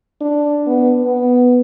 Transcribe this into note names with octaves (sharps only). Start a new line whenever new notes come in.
D4
B3
B3